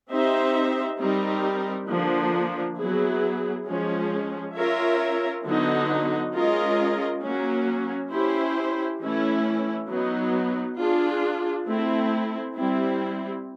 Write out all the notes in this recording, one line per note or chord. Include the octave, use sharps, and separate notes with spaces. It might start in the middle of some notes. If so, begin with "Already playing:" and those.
C4 D#4 G4 C5 E5
G3 C4 D#4 G4 A#4
D3 F3 A#3 D4
F#3 B3 E4 G#4
F3 G#3 C#4
C#4 F4 A#4 C#5 E5
D3 F#3 B3 D#4 F#4
G#3 C#4 F4 A#4 D#5
F#3 A#3 C#4 F#4
C#4 E4 G4 C5
E3 A3 C#4 E4
F#3 B3 D#4
D4 F4 G#4
A3 C4 E4
G3 C4 E4